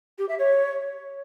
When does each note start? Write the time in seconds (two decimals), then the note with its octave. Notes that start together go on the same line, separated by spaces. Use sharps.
0.18 G4
0.29 E5
0.39 C#5